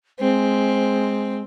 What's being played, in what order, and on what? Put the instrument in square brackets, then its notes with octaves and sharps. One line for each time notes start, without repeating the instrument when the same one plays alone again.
[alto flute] G#3 [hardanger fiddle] C4